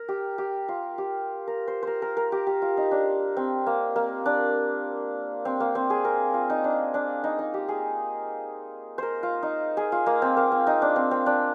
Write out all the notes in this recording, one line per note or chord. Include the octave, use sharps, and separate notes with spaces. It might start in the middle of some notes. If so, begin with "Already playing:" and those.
Already playing: A#4
G4
G4
F4
G4
A#4
C5
A#4 C5
A#4
A#4
G4
G4
F4
D#4
D4
C4
A#3
A#3
D4
C4
A#3
C4
G#4
A#4
F4
D#4
D4
D4
D#4
D#4
G4
G#4
A#4 C5
F4
D#4
G#4
F4
A#3
C4
A#3
C4
D#4
D4
C4
C4
D4